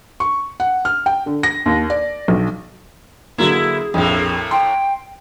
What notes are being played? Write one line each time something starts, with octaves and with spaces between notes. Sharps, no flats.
C#6
F#5
F6
G5
D3
A#6
D#2
D5
B1
D3 F#3 A#3 E4 G#4
A#1 F2 A2 A3 A#3
G5 C6